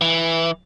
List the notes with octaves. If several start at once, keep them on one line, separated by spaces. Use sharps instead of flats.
E3